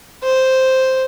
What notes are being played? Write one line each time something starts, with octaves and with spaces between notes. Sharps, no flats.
C5